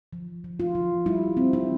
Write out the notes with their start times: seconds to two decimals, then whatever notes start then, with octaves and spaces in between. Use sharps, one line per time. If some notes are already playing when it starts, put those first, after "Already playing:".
0.13 F3
0.44 F3
0.60 F4
0.75 F3
1.06 G3 E4
1.37 C4
1.53 E4